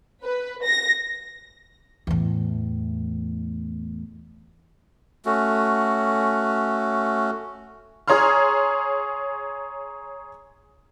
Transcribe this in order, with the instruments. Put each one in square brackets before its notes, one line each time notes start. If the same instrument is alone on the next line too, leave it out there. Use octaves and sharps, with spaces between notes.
[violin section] B4
A#6
[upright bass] E2 A2
[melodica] A3 C#4 F#4
[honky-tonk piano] G#4 C#5 A#5 C6 F6